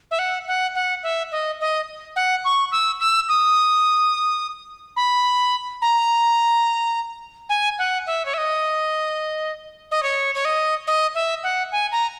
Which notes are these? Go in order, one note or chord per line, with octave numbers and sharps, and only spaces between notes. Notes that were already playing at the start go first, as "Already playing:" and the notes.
E5
F#5
F#5
F#5
E5
D#5
D#5
F#5
C#6
E6
E6
D#6
B5
A#5
G#5
F#5
E5
C#5
E5
D#5
D#5
C#5
C#5
D#5
D#5
E5
F#5
G#5
A#5